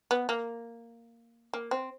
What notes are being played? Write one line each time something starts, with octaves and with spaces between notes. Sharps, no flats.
B3
A#3
A#3
C4